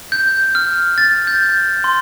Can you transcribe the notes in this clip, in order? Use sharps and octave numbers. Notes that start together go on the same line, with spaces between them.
G6
F6
A6
G6
C6